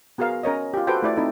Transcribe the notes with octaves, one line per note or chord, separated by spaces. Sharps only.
B3 F#4 G#4 A#4 F5
C#4 A#4 C#5 D#5
F4 G4
F#4 A4 B4 C5 G5
A3 E4 D5
C4 D#4 A4